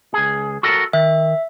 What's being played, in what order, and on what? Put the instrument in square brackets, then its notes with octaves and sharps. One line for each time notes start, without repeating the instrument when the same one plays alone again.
[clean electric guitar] C#2 G#4
F#4 A4 A#4
[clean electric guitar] D#3 [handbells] E5